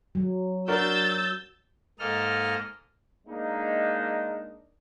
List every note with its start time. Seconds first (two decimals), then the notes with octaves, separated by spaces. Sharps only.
0.15 F#3
0.68 D4 F#4 A#4 E6 G6 A6
1.99 G#2 A#3 A4 D#5 F6
3.27 G#3 A#3 D4 D#4